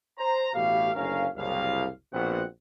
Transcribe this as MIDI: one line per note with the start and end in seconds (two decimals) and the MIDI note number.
0.18 0.49 72
0.18 0.49 82
0.54 0.91 33
0.54 0.91 47
0.54 0.91 57
0.54 0.91 67
0.54 0.91 77
0.95 1.26 30
0.95 1.26 38
0.95 1.26 61
0.95 1.26 70
0.95 1.26 77
1.36 1.86 30
1.36 1.86 36
1.36 1.86 77
2.13 2.42 34
2.13 2.42 47
2.13 2.42 60
2.13 2.42 78